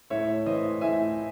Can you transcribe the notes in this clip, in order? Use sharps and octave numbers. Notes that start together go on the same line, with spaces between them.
A2 C#5 E5
E3 C5 D#5
A2 E5 G#5